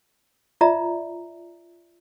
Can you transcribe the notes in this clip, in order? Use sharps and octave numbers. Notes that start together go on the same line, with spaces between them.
F4 D5 E5 A#5